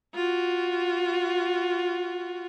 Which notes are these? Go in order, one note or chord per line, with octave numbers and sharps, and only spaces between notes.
F4 F#4